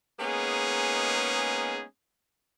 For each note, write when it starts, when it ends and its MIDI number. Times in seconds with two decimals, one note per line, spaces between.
0.20 1.83 56
0.20 1.83 58
0.20 1.83 59
0.20 1.83 61
0.20 1.83 63
0.20 1.83 68